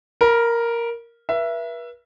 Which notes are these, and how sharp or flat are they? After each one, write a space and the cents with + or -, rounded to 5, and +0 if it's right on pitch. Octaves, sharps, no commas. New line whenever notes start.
A#4 +0 B5 -30
B4 -40 E5 +20